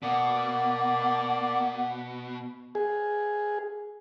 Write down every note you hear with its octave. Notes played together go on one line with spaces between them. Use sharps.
B2 A#3 D5 F#5
G#4